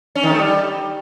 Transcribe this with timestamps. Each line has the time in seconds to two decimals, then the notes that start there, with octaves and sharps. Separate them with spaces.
0.15 C#4
0.23 D#3
0.31 A3
0.39 G3